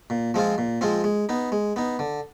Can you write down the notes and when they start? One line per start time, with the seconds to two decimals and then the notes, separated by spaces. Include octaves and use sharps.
0.10 A#2
0.34 F3 G#3 C4 F4
0.58 A#2
0.81 F3 G#3 C4 F4
1.04 G#3
1.29 B3 D#4
1.52 G#3
1.76 B3 D#4
1.99 D3